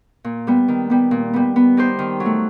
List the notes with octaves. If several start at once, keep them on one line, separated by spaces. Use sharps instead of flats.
A#2
G3 B3
D#3
G3 B3
A#2
G3 B3
B3
D#4 G4 C5
D#3
F#3
A3